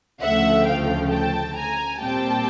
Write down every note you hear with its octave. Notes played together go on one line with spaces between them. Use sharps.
D2 C#3 F3 A3 E5 F#5
F5 G5
G5 A5
G#5 A#5
A#2 G3 C4 G5 A5